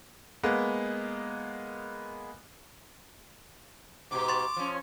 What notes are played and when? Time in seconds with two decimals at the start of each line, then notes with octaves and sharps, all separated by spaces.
0.43 G#3 A#3 B3
4.11 G#2 B2 G4 D6
4.28 C6 C#6 A6
4.57 F3 C#4